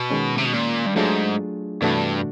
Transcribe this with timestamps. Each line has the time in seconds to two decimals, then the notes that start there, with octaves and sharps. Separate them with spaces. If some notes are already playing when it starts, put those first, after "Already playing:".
Already playing: B2
0.10 D#3 G#3 C#4
0.38 C3
0.45 B2
0.53 A#2
0.86 G2
0.96 G#2 F#3 A3 D4 F4 G#4
1.82 G2 C3 E3 A3 D4 F#4